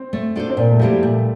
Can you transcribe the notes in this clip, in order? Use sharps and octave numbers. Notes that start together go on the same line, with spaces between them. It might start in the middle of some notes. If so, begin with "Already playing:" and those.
Already playing: C4
A3
D4 F4 A4 C5
C4
A#2 A#3
A3
F3 G3 A#3 E4 G4
A#2 A3